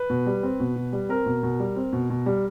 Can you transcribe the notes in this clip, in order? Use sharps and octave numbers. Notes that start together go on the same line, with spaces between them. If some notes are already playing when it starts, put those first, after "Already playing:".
Already playing: B4
B2
G3
C4
B2
B2
G3
C4 A#4
B2
B2
G3
C4
B2
B2
G3